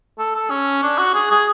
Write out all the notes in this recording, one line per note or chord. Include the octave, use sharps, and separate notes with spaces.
A4
A4
C#4
D4
F#4
G#4
G#4